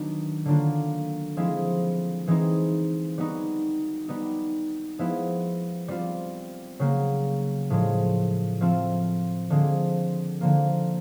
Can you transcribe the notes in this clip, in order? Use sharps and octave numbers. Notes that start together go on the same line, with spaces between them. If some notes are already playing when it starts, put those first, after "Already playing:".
Already playing: D#3 F#3 B3 D4
D3 F#3 A#3 D4 F4
F3 G#3 C4 E4
E3 G#3 C4 D#4
G3 B3 D#4 F#4
G3 B3 D#4
F3 G#3 B3 E4
G3 C4 F4
C#3 F#3 A#3
A2 F3 G#3
F3 A3 C4 F4
D3 F3 G#3 C4
D3 F3 A#3